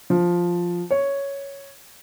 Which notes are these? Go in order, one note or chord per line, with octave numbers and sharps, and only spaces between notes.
F3
C#5